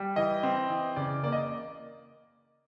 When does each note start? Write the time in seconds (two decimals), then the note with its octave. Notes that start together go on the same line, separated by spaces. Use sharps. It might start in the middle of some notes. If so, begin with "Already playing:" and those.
Already playing: G3
0.16 E3 D#5
0.43 C4
0.70 E3
0.96 C#3 D5
1.23 A#3 D5
1.32 D#5